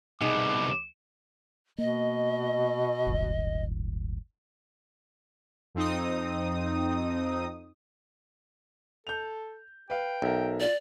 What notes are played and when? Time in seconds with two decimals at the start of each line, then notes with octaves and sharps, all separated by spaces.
0.21 C2 B2 D#4 G#4 D6
1.78 B2 A#3 D#5
3.07 D1 G1
5.75 F2 C4 D#4 D#6
9.07 A4 G6 F7
9.90 B4 F5 G5
10.22 B1 A#4 E5
10.60 F4 D5